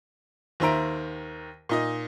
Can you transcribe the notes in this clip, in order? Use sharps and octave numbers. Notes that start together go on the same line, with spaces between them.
D#2 D#3 C5 E5 A#5 D7
A#2 D#4 D#5